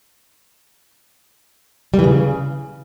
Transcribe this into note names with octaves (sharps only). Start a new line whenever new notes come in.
G3
E3
C#3